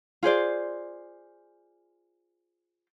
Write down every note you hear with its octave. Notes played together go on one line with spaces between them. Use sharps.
F4 G#4 C5 D5